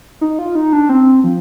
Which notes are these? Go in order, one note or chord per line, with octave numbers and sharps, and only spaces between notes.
D#4
F4
D#4
D4
C4
F3